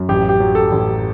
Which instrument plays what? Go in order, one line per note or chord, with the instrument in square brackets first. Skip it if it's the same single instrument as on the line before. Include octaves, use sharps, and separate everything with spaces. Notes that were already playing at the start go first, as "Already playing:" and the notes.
Already playing: [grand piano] F#2
A1 G4
G4
F#3
A4
A1